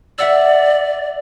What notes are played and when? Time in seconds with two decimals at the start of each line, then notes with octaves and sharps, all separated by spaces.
0.18 D5 E5 F#5 E6